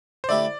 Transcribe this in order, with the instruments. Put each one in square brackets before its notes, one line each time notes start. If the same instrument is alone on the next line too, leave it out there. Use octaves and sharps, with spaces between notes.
[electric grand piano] C5
[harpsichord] D3 A3 E4 G4 [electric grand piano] D5